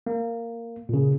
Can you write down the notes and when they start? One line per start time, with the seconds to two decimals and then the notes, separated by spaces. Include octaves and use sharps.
0.07 A#3
0.89 A#2 C#3